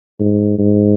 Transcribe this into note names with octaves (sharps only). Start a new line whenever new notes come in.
G#2
G#2